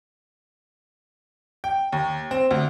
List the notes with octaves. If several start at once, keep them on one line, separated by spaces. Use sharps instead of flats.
G5
D#2
C4
D2